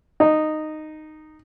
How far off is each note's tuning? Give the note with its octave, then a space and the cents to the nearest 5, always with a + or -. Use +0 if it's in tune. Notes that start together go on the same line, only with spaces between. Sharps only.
D#4 -10